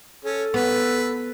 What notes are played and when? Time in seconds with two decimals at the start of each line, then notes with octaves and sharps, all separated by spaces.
0.25 C#4 A4
0.54 B3 B4